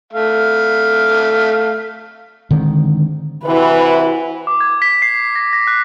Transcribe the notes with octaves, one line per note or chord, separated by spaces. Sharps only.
A3 F5
D3 D#3 G#3 C4
C3 E3 E4 F#4 B4
D6
G#6
B6
C7
A#6
A#6
F#6